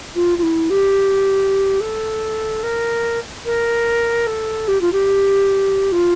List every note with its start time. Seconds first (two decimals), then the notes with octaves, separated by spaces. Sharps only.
0.15 F4
0.38 F4
0.42 E4
0.70 G4
1.80 A4
2.63 A#4
3.45 A#4
4.26 A4
4.68 G4
4.81 F4
4.92 G4
5.92 F4